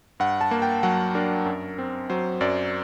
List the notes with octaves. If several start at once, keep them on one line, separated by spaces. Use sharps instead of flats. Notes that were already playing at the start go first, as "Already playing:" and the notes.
G2 F#5
A5
A#3
G5
F#3 F#5
D4 A#4
F#2
C4
F#3 C5
F#2 D5